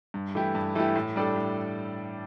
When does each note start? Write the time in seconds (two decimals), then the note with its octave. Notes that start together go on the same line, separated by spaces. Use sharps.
0.14 G2
0.35 E3 A3 E4 G4
0.55 G2
0.75 E3 A3 E4 G4
0.96 A2
1.16 G3 D4 A4
1.36 A2